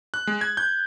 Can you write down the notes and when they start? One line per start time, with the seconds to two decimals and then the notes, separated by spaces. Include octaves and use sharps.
0.14 F#6
0.27 G#3
0.41 G#6
0.57 G6